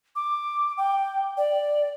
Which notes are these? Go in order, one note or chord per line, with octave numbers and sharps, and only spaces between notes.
D6
G5
D5